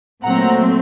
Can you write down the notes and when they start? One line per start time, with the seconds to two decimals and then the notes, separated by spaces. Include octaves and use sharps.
0.23 A#2 F#3 A3 C4 F#5 A#5